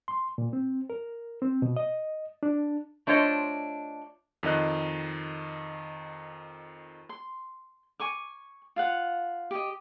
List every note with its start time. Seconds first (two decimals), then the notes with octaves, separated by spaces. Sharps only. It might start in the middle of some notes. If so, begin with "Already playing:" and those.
0.08 C6
0.38 A#2
0.53 C4
0.90 A#4
1.42 C4
1.62 B2
1.76 D#5
2.43 D4
3.07 A3 D4 F4 C5 C#5 D#5
4.43 F2 D#3 D#5 F#6
7.09 C6
8.00 G#5 C#6 D6
8.76 F4 F5 F#5
9.51 G4 D#5